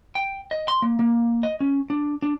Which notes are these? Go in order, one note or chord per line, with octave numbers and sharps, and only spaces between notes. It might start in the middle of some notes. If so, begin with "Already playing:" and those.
G5
D#5
C6
A#3
A#3
D#5
C#4
D4
D4